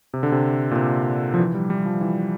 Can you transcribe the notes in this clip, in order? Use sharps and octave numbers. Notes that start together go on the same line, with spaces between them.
C3
D3
C3
A#2
C3
F3
E3
G3
G3
F3
E3